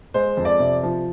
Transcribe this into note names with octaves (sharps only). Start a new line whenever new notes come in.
G#3 C5
F2
D5
C3
F3